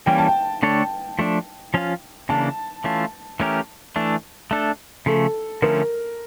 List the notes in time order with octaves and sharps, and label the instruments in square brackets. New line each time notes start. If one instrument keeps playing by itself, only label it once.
[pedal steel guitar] E3 G3 A#3 C#4 [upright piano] G5
[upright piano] A5
G5
[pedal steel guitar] D3 A3 D4 A4 C#5
F3 A3 D4
F3 C#4 F4
[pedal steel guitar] C#3 E3 A#3 D4 [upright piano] A5
[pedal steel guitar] E3 A3 C#4 F4
E3 A3 C#4 G4 A#4
E3 A3 D4
A3 D4 A4
[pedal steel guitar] C#3 F3 A3 [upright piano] A4
[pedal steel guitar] D3 F3 A3 C#4 [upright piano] A#4